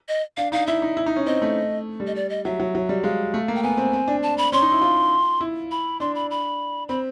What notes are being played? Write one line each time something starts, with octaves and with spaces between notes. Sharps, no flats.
D#5
D4 F5
D#4 F5
E4 E5
D#4
E4
D#4
C#4
C4 D#5
A3
G3
D#5
D5
D#5
F#3 E5
F#3
F#3
G3
G#3 F5
A3
A#3
G5
B3 G#5
C4
C4
D4
A5
B5
C#4 C6
D#4
E4
F4
E4
B5
D4 C6
B5
B5
C4 B5